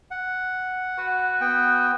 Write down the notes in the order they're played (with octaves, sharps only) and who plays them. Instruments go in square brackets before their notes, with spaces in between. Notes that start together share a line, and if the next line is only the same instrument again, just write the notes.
[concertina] F#5
[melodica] F#4 B4
[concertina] B3 G5